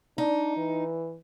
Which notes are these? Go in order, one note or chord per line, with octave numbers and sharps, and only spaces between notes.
D4 D#4
E3